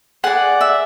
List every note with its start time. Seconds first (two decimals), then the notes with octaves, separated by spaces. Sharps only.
0.24 G#4 D5 F#5
0.61 E5